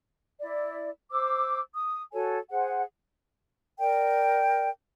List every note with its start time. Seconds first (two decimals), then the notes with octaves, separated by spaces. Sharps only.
0.40 E4 D5
1.11 C5 D6 E6
1.75 D#6
2.13 F#4 A4 C#5 G#5
2.49 G#4 C5 F#5
3.80 A#4 D5 G5